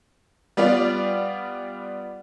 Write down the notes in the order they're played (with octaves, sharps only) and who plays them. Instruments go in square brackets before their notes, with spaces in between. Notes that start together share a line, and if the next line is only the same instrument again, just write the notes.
[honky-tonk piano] G3 B3 F4 D5